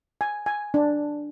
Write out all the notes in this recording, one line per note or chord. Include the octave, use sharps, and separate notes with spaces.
G#5
G#5
D4